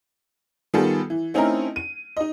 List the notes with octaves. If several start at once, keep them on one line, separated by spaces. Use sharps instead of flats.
D#3 G3 B3 F4 G#4 A4
E3
A3 C4 C#4 D#4 E4 A#4
D#7
D#4 D#5